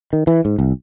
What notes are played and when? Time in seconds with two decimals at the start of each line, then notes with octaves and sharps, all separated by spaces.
0.13 D#3
0.27 E3
0.45 G#2
0.59 C2